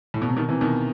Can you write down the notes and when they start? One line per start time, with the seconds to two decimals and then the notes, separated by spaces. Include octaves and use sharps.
0.14 A2
0.22 B2
0.29 C3
0.36 B2 D#3
0.48 C3 E3
0.61 B2 D#3